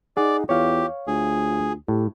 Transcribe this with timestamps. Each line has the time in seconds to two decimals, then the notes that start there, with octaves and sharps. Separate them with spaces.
0.17 D#4 G#4 D5 F#5
0.49 E2 F4 G4 C#5 F5
1.07 D2 F4 G#4
1.88 A2 G4